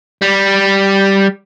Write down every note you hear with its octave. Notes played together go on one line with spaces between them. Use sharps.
G3